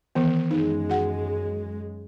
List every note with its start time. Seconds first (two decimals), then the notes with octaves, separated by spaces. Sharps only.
0.15 D#3 E3 B3
0.51 F#2 G#3 D#4
0.89 F#4 F#5